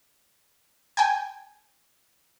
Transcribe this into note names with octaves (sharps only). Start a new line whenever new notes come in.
G5 G#5